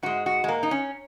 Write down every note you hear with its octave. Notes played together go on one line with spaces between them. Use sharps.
G#2 G#3 F#4
F#4
G#3
A#3
D#4
C#4